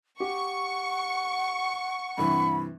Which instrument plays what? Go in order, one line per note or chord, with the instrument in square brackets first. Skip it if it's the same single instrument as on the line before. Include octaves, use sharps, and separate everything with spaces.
[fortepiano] G4 [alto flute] F#5 [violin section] C#6
[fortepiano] G2 C3 E3 [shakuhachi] B5